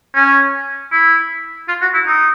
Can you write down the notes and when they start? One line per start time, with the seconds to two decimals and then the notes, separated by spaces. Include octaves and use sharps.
0.15 C#4
0.91 E4
1.68 F4
1.81 F#4
1.94 E4
2.06 D#4